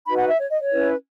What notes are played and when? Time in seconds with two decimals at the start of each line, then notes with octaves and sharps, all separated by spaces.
0.06 D#4 F#4 B4 B5
0.17 F#5
0.28 E5
0.39 C#5
0.50 D#5
0.60 C#5
0.72 C#4 E4 B4